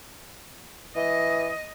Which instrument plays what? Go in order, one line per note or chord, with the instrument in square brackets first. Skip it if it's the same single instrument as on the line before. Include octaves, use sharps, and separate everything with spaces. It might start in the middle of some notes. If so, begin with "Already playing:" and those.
[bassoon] E3 [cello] D#5